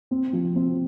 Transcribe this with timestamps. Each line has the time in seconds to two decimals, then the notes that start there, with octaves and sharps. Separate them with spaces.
0.11 C4
0.33 F3
0.55 C4